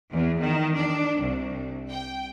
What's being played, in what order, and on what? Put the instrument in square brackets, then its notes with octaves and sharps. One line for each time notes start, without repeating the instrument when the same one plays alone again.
[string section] E2
D#3
D4
C2
G5